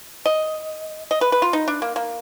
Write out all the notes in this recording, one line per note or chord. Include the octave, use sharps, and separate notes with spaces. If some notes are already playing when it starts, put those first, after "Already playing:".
D#5
D#5
B4
B4
F4
D#4
D4
A#3
A#3